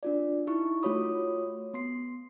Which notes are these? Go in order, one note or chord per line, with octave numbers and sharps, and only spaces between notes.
D4 F4 D5
D#4 E4 C#6
A3 F4 F#4 C#5 B5 D#6
B3 C6 C7